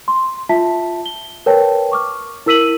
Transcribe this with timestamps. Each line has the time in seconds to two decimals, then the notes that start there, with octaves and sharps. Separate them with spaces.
0.08 C6
0.49 F4 E5 A5 B6
1.06 G7
1.46 A#4 B4 C#5 G5 A5
1.92 C#6 D6 F6
2.46 E4 A#4 E6 B6 D#7 F#7